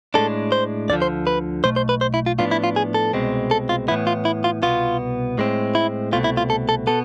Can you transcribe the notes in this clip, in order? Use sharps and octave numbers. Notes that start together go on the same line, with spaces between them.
A2 G#3 D4 A4
C5
D2 D3 F3 D5
C5
B4
B1 B2 A3 C5
C5
B4
C5
E4
F4
A2 F3 B3 D4 F4
E4
F4
G#4
A4
C2 B2 G#3 C4
A4
F4
A2 E3 B3 E4
F4
E4
F4
C2 B2 B3 F4
A2 G#3 C4
E4
C2 B2 A3 C4 F4
E4
F4
A4
A4
B2 B3 A4